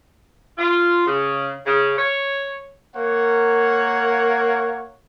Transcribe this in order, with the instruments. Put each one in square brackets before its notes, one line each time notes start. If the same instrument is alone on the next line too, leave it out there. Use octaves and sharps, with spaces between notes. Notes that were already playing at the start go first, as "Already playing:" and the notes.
[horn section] F4
C#3
C#3
C#5
[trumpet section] A#3 A#4 C#5 F#5